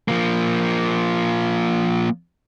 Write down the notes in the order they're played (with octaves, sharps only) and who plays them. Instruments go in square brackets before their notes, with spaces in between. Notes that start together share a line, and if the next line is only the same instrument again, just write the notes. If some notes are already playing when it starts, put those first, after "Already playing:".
[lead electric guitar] F3 A#3